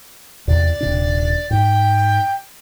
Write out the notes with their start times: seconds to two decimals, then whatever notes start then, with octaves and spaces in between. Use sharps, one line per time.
0.48 E2 C3 D5
0.81 D#1 C3 D4
1.50 G#2 G5